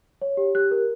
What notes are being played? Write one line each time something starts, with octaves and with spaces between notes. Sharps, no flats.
C#5
G4
G4 F#6
A#4